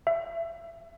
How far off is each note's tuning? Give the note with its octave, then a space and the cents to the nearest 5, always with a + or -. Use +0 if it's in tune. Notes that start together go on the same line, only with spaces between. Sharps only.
E5 +25